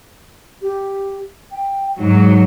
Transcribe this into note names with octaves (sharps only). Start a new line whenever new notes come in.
G4
G5
G#2 F#3 D#4